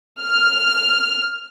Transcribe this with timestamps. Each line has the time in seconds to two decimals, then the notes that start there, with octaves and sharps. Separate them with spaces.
0.21 F6